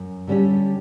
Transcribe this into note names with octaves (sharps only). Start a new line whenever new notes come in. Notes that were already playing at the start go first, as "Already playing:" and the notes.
Already playing: F#2
D3 G3 C#4 G4